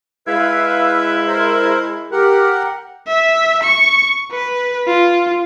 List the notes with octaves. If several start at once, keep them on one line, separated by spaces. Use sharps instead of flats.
G#3 E4 B4 E5 F5
A#4 C5
G4 A#4 F#5
E5
C#6
B4
F4